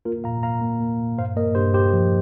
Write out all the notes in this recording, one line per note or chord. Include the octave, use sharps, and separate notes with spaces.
A#3 F4 A#4
A#2 F5 A#5
A#3 F5 A#5
A#3
A#3
A#2
G2 C5 F5
A#3 A#4 D#5
G2 G4 C5
G2 G4 C5
F3